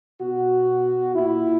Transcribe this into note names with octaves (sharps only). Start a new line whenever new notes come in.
B2 F#4
A#2 E4